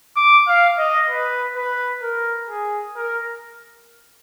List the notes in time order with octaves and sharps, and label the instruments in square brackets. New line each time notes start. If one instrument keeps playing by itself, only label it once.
[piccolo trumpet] D6
F5
D#5
B4
B4
A#4
G#4
A#4